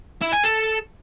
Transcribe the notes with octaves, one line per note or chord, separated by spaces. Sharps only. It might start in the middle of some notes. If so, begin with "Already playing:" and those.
E4
G#5
A4